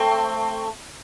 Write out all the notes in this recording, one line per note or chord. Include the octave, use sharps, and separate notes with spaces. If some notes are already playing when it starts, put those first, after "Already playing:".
Already playing: A3 C4